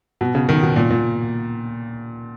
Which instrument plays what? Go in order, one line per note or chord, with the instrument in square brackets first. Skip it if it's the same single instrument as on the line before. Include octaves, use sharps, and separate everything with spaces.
[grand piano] B2
C#3
D#3
B2
A#2
A#2